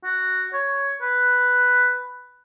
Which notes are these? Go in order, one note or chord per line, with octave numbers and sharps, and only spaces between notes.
F#4
C#5
B4